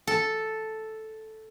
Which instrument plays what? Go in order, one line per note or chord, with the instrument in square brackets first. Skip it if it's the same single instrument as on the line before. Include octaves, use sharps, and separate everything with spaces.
[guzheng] A4